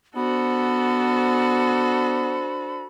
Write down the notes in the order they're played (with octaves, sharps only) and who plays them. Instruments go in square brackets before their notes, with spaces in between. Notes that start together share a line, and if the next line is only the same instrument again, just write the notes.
[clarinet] B3 [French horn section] D4 C5 [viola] F#4 A4 [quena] B5